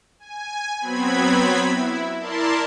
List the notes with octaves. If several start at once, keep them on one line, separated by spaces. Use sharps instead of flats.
G#5
F#3 B3 C4 B5 G#6
E4
E4 A#4 D5 A5 C6